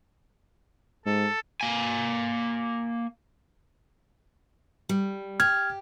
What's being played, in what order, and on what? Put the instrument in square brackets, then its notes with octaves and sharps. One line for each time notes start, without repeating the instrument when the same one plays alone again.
[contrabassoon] G#2 [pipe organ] A4
[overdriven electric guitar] A#3 G#5
[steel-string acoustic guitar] G3
[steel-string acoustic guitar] G4 [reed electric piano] F6 G#6